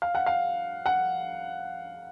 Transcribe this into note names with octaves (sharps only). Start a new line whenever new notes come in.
F5
F#5
F5
F#5